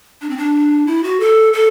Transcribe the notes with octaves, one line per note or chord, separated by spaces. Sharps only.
D4
C4
D4
E4
F#4
A4
A4